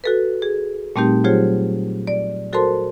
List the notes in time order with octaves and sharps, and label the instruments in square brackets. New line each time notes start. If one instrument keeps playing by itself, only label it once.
[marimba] F#4 A4 B4
G#4
A#2 G3 A3 C4 D#4 G4
F#3 F4 G4 G#4 C5 C#5
D5
F#4 A4 A#4 C5 A5 C6